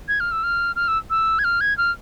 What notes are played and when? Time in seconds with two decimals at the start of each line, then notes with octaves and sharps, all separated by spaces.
0.08 G#6
0.20 F6
0.32 E6
0.43 F6
0.76 F6
0.88 E6
1.10 E6
1.39 G#6
1.44 F6
1.61 G#6
1.78 F6